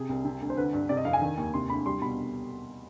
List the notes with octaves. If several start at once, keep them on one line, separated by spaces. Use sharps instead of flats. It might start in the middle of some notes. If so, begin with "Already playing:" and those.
Already playing: C3 G#4
C2
C3
D2
C5
D3 B4
G2
C3 D5
D#5
F2 F5
G#5
D#3
D#2
C3 C6
D2 B5
G3 C6
B2 B5